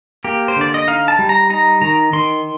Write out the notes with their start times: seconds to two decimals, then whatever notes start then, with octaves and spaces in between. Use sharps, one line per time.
0.24 A#3 G4
0.48 C5
0.56 D3 D5
0.74 D#5
0.88 D#4 F5
1.08 A5
1.19 G3
1.29 A#5
1.50 D#4 A#5
1.82 D#3 A#5
2.13 D#3 C6